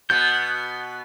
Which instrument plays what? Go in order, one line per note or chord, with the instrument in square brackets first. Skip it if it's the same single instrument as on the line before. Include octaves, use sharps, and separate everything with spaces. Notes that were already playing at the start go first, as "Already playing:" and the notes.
[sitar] B2 B3 [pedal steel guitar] G6